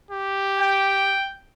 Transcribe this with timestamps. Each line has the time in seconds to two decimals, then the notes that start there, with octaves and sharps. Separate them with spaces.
0.11 G4
0.59 G5